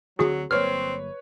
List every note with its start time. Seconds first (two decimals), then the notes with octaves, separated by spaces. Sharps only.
0.19 D2 D3 F#3 C4 F#4 G#4
0.51 G1 F#3 A#3 C4 B4 C#5 F6